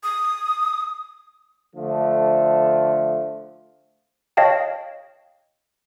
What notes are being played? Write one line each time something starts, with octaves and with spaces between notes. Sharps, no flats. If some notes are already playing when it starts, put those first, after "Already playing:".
D#6
D3 F3 A3
C#5 D#5 F5 G5 A5